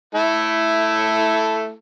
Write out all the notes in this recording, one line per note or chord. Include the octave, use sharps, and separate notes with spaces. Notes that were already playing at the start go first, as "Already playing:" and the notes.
A3 E4 A4